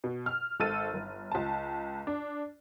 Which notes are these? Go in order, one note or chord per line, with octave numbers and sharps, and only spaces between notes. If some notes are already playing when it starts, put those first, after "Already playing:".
B2
F6
G#1 A4 E6 A6 D#7
G1
C#2 A5
D4